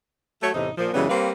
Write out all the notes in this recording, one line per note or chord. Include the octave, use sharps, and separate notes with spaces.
F#3 A3 F#4 C#5 E5
E2 A2 C3 D#4
A#2 F3
F#2 C#3 E3 G3 G#3 B3
G3 A#3 C4 B4 C5 F5